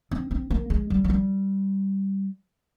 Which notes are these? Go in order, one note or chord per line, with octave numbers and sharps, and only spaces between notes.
C4
C4
A#3
G#3
G3
F3
G3